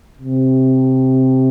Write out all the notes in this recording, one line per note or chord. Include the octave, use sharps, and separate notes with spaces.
C3